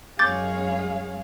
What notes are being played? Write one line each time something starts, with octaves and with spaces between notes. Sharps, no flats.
F#2 G#3 G#4 C#5 F5 D6 G6 A6